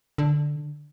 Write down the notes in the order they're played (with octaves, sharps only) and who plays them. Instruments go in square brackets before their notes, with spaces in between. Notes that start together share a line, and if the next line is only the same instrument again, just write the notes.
[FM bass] D3